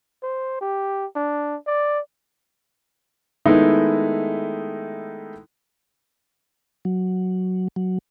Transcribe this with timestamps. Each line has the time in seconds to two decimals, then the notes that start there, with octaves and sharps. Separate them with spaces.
0.23 C5
0.61 G4
1.16 D4
1.67 D5
3.46 D#3 G#3 A3 B3 D#4 E4
6.85 F#3
7.76 F#3